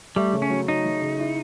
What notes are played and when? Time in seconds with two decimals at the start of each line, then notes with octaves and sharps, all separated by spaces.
0.16 G3 A3
0.33 C#3
0.42 C#4
0.50 F#3
0.68 F#3 D#4
0.85 F#3
1.02 C#3
1.19 E4